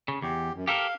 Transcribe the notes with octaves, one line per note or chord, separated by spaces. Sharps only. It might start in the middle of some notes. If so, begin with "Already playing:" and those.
C#3
E2 G4
F#2
G4 A4 A#4 F5